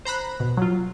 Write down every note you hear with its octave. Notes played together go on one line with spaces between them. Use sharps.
C5 A#5 B5 F#6
B2
F#3 F4